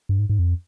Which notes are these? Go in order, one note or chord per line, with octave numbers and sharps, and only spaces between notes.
G2
G#2
G#2
F2